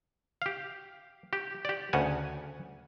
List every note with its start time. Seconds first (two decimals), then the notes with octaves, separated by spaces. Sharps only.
0.42 G4 F5
1.33 G4
1.65 G4 D5
1.93 D2 C#3 F#5 G#5